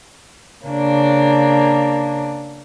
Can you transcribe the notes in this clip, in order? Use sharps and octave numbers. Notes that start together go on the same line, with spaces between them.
C#3 A#3 D4